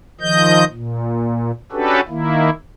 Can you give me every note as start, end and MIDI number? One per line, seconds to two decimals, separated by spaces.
0.21 0.64 51
0.21 0.64 53
0.21 0.64 75
0.21 0.64 91
0.72 1.51 46
1.72 2.00 61
1.72 2.00 62
1.72 2.00 66
1.72 2.00 67
1.72 2.00 69
1.72 2.00 71
2.08 2.50 51
2.08 2.50 58
2.08 2.50 64